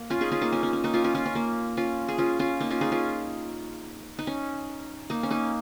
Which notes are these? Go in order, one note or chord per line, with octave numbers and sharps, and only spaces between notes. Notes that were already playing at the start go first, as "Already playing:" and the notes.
Already playing: A#3
C#4 F4
D#4 G#4
C#4 F4
A#3 D#4
C#4
C#4
C#4
A#3 D#4
C#4 F4
C#4 F4
C#4 F4
C#4
A#3
C#4 F4
G#4
C#4 F4
C#4 F4
A#3 D#4
C#4 F4
D#4 G#4
C#4 F4
D#4
C#4
A#3 D#4
C#4
A#3 D#4